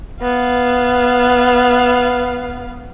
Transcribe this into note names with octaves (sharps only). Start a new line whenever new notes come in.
B3 F5